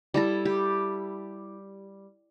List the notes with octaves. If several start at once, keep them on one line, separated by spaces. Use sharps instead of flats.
G3 E4 A4
G4